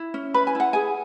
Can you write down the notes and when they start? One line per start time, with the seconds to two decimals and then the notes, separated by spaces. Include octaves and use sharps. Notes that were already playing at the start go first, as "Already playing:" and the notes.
Already playing: E4
0.14 C#4
0.34 B4 B5
0.47 G#5
0.55 E4 F#5
0.73 G#4 G#5